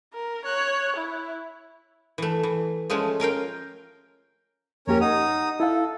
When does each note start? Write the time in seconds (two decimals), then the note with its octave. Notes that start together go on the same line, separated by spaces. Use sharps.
0.14 A#4
0.45 C#5 F#6
0.96 E4
2.18 E3 A3
2.43 E3
2.90 F3 G#3 A3 C#4
3.20 C#4 A#4 F5 G5
4.87 F2 A#3 C#4 G4 A#4 C#5
5.01 D#4 F#5 D#6
5.60 E4 A4 F5